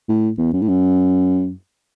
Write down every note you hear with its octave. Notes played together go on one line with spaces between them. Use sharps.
A2
E2
F#2
A2
F#2